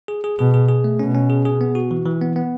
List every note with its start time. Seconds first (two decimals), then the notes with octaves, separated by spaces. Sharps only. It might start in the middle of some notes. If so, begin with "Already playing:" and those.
0.08 G#4
0.24 G#4
0.39 B2 G#4
0.54 G#4
0.68 G#4
0.84 A3
0.99 B2 C#4
1.15 C#4
1.30 G#4
1.45 G#4
1.61 B3
1.75 F#4
1.91 E3
2.06 E3
2.21 B3
2.36 B3